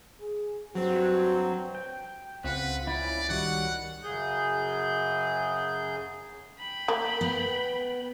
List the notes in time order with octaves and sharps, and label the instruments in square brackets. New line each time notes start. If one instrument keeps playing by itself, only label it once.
[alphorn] G#4
[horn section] G2 C4 [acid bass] F#3 [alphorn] F#4
[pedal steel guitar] G5
[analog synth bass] C#2 [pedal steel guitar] C4 F4 F#5 [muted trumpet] B4
[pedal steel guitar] C#4 E4 [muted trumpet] D5
[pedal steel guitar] D#3 G3 F#4 [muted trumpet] F#5
[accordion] F#2 C#3 G#4 G6
[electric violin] G5 B5
[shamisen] A#3
[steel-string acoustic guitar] B3